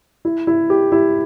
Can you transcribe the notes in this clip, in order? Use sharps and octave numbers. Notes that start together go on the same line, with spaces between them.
E4
E4
G4
E4